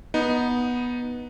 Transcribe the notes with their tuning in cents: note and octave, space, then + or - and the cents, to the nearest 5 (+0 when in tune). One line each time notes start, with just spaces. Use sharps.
B3 -10 D#4 +0